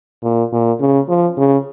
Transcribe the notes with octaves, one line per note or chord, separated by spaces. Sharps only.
A#2
A#2
C#3
F3
C#3